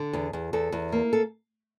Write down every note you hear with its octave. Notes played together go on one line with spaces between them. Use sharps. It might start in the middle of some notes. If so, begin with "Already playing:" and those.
Already playing: D3
E2
E2
E2 A4
E2
A#3
A4